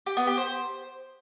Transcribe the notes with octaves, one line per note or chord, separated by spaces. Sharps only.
G4
B3
G4
C5